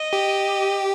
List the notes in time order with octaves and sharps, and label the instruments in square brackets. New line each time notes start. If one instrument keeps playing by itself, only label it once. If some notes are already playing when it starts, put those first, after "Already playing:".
Already playing: [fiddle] D#5
[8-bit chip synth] G4